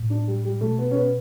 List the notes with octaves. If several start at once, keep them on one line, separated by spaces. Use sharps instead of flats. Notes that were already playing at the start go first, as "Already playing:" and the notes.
Already playing: A2
D4
G3
G3
B2 A3
B3
C#4
B3